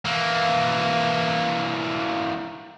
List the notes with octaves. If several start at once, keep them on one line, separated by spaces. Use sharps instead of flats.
E3 A#3